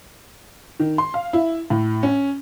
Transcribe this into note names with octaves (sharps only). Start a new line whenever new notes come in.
D#3
C6
F5
E4
A2
C#4